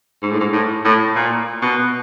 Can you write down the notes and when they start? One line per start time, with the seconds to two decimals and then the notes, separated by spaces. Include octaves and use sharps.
0.22 G#2
0.31 A2
0.40 G#2
0.53 A2
0.85 A2
1.16 A#2
1.62 B2